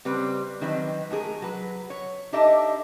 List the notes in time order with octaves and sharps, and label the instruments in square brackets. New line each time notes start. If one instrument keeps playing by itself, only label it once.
[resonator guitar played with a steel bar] C#3 G3 C4 B4
D#3 F#3 C4 B4 D#5
G#3 A3 B3 G#4 A#4
F#3 B4
C#5
D4 D#4 G4 A4 D#5 E5